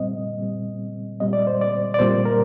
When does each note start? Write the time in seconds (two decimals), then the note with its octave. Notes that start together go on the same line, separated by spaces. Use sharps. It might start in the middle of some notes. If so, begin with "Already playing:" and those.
Already playing: A#2 G3 C4 D#5
0.40 A#2 G3 C4
1.20 A#2 G3 C4 D#5
1.33 D5
1.47 C5
1.61 D5
1.94 D5
1.99 A#2 G3 C4 C5
2.25 A#4